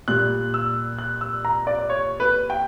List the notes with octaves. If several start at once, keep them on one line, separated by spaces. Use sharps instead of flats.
A#2 G3 F#6
E6
F#6
E6
A#5
D5
C#5
B4
G5